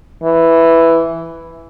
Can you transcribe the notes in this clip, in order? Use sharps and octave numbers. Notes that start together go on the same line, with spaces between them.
E3